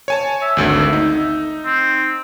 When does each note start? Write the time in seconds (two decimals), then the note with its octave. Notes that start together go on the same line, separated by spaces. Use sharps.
0.08 C#5 G#5 A5
0.42 E5
0.57 G#1 D2 A3
0.93 D#4
1.65 C4